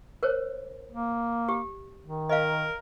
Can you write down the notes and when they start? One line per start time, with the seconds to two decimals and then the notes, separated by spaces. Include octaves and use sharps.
0.23 A#4 C5 C#5
0.92 A#3
1.49 G4
2.03 D#3
2.29 A#4 D#5 F5